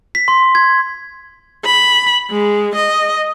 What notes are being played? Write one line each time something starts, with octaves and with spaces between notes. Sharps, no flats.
B6
C6
G#6
B5
G#3
D#5